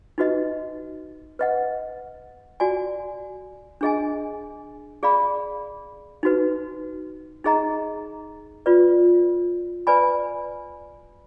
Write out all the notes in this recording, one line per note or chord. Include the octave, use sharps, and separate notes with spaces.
D#4 F#4 B4 D#5
B4 D#5 F#5
F#4 D5 G#5
D4 G#4 D#5 G#5
G#4 D5 F5 B5
D#4 F#4 B4
D#4 G#4 D#5 A#5
F4 B4 D5
B4 D5 G#5 B5